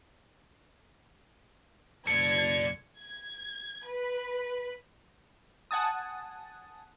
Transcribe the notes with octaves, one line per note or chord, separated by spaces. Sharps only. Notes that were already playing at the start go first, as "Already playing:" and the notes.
F#1 B1 A4 D5 G#6 C#7
G#6
B4
F#5 G#5 A5 D#6